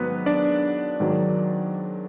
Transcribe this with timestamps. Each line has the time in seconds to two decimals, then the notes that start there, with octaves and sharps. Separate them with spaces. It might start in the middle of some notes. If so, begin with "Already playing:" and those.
Already playing: G#2 D#3 F#3 B3 B4
0.26 D4 D5
1.00 G#2 D#3 F#3